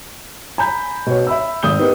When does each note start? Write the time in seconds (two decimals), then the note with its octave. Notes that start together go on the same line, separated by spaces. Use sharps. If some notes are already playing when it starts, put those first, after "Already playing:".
0.58 G#5 A#5 B5 G6
1.07 B2 C#5
1.27 E5 B5 E6
1.63 G#1 D#6 G6 G7
1.79 B3 D#4 G4 A#4